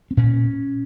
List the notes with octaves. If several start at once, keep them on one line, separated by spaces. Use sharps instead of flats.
C4
A#2 C#4